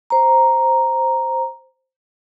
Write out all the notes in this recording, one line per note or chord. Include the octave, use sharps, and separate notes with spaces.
C5 A#5